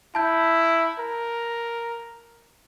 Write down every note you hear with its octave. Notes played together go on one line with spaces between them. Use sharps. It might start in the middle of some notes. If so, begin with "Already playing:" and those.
E4 A5 G6
A#4